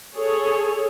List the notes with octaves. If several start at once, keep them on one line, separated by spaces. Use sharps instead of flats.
G#4 A4 C#5